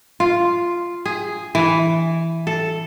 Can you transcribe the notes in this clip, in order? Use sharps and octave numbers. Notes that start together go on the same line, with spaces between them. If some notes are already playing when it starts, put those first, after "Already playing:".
F4
G#4
E3
A4